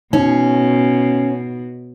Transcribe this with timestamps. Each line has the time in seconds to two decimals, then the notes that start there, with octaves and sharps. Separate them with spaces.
0.13 B2 C#4 D#4